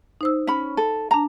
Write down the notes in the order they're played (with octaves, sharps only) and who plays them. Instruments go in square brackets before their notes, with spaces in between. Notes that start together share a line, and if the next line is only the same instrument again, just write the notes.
[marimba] D#4 C5 E6
[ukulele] C#4 B5
A4
[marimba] D4 A5 [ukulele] A#5